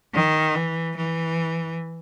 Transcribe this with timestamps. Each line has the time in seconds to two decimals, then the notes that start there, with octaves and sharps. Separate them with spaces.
0.14 D#3
0.55 E3
0.96 E3